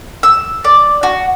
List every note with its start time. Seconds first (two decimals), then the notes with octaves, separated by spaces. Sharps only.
0.23 E6
0.64 D5
1.03 F#4